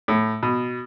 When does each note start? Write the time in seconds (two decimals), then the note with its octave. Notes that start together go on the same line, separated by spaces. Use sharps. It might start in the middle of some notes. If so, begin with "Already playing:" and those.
0.08 A2
0.43 B2